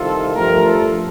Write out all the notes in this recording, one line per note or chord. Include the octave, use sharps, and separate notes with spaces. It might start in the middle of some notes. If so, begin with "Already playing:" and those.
Already playing: C2 C3 D#3 F4 A4
G2 F3 A3 G4 A#4
F4 A4